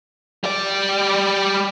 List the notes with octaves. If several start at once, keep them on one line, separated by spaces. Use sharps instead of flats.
G3 D5